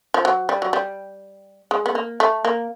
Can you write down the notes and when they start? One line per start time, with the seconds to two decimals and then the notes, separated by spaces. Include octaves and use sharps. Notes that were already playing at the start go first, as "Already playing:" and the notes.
0.14 F3
0.25 F#3
0.49 G3
0.62 F#3
0.73 G3
1.71 G#3
1.86 B3
1.95 A#3
2.20 A3
2.45 A#3